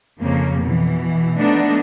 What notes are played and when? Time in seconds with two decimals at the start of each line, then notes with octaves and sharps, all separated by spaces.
0.20 F2 C#3 A#3
0.63 B2 E3
1.39 F3 A3 B3 D4 D#4